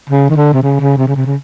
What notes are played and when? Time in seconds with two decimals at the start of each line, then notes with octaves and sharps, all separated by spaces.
0.10 C#3
0.30 D#3
0.36 D3
0.53 C3
0.63 C#3
0.80 C#3
0.98 C3
1.07 C#3
1.16 C3
1.26 C#3